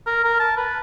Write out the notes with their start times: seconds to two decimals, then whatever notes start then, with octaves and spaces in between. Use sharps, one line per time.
0.06 A#4
0.24 A#4
0.39 A5
0.57 B4